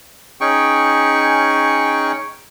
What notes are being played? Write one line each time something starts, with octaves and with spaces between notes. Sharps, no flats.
C#4 D#4 G#4 G5 C#6